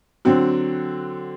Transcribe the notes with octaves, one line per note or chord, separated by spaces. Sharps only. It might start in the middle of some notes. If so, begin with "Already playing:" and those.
D3 F#3 C4 F#4